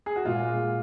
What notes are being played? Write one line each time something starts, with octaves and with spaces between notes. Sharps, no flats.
G#4
F#4
A#2 G#3 F4